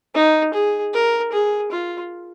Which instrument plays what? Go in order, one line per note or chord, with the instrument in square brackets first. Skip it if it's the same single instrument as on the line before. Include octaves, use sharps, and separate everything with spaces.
[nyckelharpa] D#4
G#4
A#4
G#4
F4